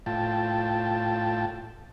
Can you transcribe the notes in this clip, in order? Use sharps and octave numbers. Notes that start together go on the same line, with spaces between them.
A2 F4 G5 A5